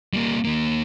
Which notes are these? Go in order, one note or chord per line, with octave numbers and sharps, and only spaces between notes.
G3 A#3
D#2 A#3